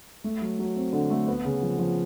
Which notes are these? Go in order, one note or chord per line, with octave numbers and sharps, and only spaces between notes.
A3
F#3
F#3
C4
D3
A3
B3
C#3
F3
F3